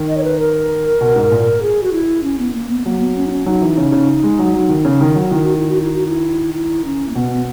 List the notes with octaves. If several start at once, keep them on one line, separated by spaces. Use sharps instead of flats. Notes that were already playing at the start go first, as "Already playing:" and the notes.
Already playing: D#3
D#5
C#5
B4
A#4
B2
G#2
A#2
G#4
F#4
E4
C#4
B3
A#3
B3
F#3 A#3
B3
C#4
D#4
C#4
F#3 D#4
E3
C#3
C#3
G#3
F#3
F#3
D#3
C#3
D#3
F#3
D#3 E4
F#4
E4
F#4
E4
F#4
E4
E4
C#4
A#3
B2 B3
B3